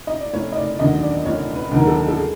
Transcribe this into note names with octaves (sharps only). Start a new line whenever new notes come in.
D#5
D5
F1 C#5
D#5
D5
D#2 D3 F#3 D#5
D5
F1 C#5
B4
D#2 D3 F#3 A#4
A4
A4
G#4